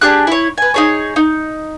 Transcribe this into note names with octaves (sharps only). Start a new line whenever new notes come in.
D4 G4 G#4 F#6
E4 C#5
B4 G#5
D#4 G#4 C#5
D#4